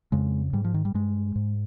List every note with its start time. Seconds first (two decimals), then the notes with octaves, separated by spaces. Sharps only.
0.12 F2 C#3 G#3
0.53 G#2 G3
0.64 F3
0.74 D#3
0.85 G3
0.94 G2 G#3
1.35 G#2